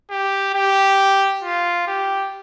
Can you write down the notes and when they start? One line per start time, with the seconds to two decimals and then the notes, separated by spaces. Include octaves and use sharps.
0.11 G4
0.54 G4
1.43 F4
1.87 G4